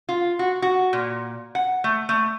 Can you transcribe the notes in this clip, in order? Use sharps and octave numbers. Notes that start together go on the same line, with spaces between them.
F4
F#4
F#4
A#2
F#5
A3
A3